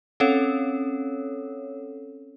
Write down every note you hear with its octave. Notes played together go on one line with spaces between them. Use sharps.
C4 C#4 A4 C#5